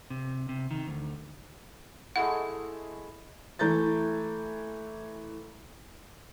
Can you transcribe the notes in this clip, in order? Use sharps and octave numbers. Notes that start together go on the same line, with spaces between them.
C3
C3
D#3
D2
G#3 A3 E4 F#5
E3 A3 A#5 G6 A6